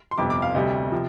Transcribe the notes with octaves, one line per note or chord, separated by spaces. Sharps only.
C6
G1 F2 C3 D6
D6
F5
D2 C3 G3 D#5
C3 F3